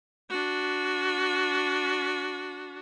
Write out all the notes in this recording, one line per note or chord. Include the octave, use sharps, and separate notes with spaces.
D4 F#4